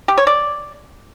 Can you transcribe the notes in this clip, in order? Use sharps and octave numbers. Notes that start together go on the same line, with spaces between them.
G4
C#5
D5